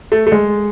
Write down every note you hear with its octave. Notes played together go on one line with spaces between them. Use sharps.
A3
A3
G#3